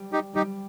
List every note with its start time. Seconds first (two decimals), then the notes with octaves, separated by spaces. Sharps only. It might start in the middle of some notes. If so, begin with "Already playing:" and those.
Already playing: G3
0.13 D#4 G4
0.35 G3 D#4 G4